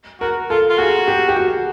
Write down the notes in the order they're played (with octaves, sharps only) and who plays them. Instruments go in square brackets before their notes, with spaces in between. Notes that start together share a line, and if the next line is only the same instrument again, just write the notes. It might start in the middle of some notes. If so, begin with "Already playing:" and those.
[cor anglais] F#4 [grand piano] A#4
[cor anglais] F4 [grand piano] A4
[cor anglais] F4
[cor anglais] F#4 [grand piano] G#4
[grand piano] G4
G4
F#4